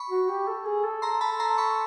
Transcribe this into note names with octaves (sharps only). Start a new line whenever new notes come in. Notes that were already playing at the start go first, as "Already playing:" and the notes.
Already playing: B5 C#6
F#4
G4
A4
G#4
A4
A#5 C6
A5 B5
A#5 C6
B5 C#6